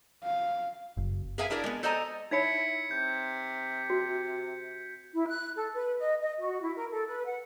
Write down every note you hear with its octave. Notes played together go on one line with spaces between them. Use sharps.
F5
F#1
G#4 A#4 B4 E5 F5 G#5
D4 E4 G#4 A#4 D5
G#3 B3
A4 C5 D5 D#5 G#5 A#5
D#4 E4 C#5 B5 G#6 B6 C#7
C3 G6
F#4
E4
F#6
A4
B4
D#5
D#5
F#4
E4
A#4
A4
B4
F#5